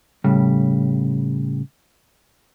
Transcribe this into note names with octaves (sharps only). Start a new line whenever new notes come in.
A2 C#3 G3